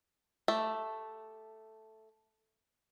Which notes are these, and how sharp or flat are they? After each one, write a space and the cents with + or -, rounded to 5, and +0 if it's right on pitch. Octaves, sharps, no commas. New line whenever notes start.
A3 +0 G4 +0 E5 +0